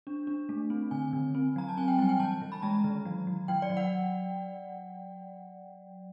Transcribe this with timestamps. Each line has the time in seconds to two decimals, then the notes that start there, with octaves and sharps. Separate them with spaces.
0.07 D4
0.27 D4
0.49 A3
0.70 C4
0.91 D3 G#5
1.13 D3
1.35 C4
1.56 F#3 A#5
1.68 A5
1.77 C4 G#5
1.88 G5
1.99 G3 G#5
2.09 G5
2.20 E3 A5
2.41 E3
2.52 B5
2.62 G#3 A#5
2.84 D#3
3.05 F#3
3.27 F#3
3.48 F#3 G5
3.62 D5
3.70 F#3
3.77 F#5